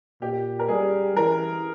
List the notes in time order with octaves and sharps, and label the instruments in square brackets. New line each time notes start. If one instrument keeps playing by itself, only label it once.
[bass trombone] A#2 [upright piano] G4
[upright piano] A#4
[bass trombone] G3 [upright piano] G#4
[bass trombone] E3 [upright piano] A#4